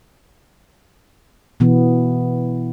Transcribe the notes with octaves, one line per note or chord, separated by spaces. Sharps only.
B2 E3 B3